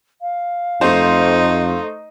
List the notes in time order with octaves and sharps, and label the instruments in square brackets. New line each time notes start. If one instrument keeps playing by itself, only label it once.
[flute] F5
[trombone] F2 [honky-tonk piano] A3 C5 [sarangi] D#4